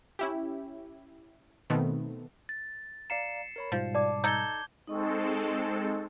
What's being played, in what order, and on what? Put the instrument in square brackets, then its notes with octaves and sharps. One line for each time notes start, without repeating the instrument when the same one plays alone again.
[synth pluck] C#4 E4 G4
B2 D#3 A3 B3 C4
[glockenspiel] A6
[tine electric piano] D5 F5 A#5 [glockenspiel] C7 C#7 E7
[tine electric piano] A#4 C#5 B5
[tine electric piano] G#2 B2 G3 [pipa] F3
[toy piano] D5 [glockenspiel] A5 D6
[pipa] D#4 A4 [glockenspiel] G6 G#6 G7
[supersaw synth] G#3 C4 A4 [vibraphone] D#4 D#5 C#6